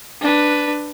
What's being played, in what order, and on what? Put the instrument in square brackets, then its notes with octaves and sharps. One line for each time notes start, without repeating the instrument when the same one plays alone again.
[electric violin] D4 B4